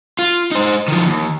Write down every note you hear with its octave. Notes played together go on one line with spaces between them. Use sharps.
F4
D#4 C5
D#3 F3
D#2